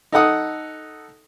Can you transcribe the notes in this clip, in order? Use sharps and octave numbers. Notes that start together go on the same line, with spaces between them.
D#4 A4 F#5 D#6